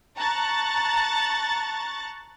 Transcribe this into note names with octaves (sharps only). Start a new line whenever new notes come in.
A5 A#5 C#6 F#6 A6